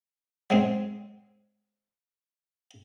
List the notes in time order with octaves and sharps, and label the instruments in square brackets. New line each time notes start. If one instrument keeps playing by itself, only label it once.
[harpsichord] F#3 G#3 C4